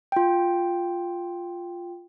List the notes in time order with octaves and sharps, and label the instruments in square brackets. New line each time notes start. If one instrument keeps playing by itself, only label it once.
[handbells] F4 G5